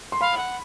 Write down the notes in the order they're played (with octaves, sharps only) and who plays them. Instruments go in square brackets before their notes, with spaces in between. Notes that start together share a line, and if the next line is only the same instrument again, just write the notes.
[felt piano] C6
[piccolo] F5 [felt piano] B5
[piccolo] F#5